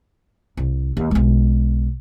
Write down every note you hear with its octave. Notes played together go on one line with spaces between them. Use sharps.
C2
D#2
B1 G#3